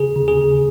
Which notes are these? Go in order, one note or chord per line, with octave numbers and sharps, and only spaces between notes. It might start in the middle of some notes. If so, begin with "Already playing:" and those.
Already playing: C#3 G#4
C#3
G#4
C#3